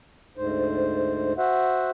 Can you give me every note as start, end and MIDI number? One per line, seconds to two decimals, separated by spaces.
0.37 1.33 38
0.37 1.33 44
0.37 1.33 72
1.38 1.90 66
1.38 1.90 72
1.38 1.90 76
1.38 1.90 78